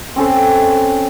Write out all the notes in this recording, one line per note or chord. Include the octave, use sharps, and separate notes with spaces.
C4 C#4 A4 C5